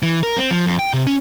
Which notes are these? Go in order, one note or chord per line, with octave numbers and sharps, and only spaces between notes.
E3
A#4
C4
F3
F2
G5
C3
C#4